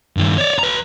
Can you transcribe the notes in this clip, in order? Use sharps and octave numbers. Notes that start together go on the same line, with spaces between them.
G2 D#3
C#5 D5
B4 A#5